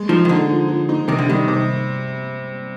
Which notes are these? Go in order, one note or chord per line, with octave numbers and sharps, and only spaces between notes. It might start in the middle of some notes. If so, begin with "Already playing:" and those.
Already playing: G#3
F3 D#4
D#3
D3 D#4
F3
F3
D#4
C3 D#3
D3
D#3 G3
C3